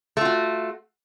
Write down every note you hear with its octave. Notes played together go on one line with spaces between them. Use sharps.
A3 F4 F#4